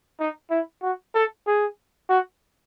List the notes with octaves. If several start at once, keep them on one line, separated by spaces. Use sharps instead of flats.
D#4
E4
F#4
A4
G#4
F#4